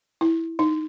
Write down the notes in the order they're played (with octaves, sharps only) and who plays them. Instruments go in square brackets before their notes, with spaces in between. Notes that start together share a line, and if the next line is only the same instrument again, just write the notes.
[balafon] E4
D#4